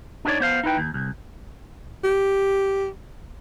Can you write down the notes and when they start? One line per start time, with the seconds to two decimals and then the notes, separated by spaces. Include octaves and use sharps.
0.25 D4 D#4 F#4 B4 C#5 D5
0.40 B3 C5 F5
0.64 D#4 E4 B4 G5
0.77 D#2
0.94 C2
2.04 G4